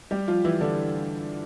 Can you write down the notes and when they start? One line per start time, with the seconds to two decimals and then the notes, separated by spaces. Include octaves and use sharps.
0.11 G3 G4
0.28 F3 F4
0.45 E3 E4
0.61 D3 D4